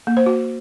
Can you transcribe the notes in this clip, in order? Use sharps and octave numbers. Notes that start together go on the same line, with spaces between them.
A#3
C5
F#4